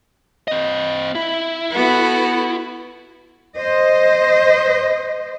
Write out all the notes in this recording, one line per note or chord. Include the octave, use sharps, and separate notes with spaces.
C4 D#5
E4
B3 F#4 A4
C5 D#5